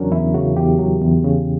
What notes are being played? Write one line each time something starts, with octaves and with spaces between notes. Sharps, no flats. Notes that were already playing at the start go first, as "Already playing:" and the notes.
Already playing: E2 C#3 F#3 C#4 D4 A#4
E2 E4
C#3 F#4
E2 G4
F#3
E2
C#3